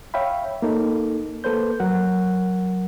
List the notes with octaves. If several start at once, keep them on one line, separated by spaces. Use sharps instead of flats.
C#5 E5 F5 G5 B5
A#3 D#4 A4
A#3 A4 B4 C5 G6
F#3 A#4 F#5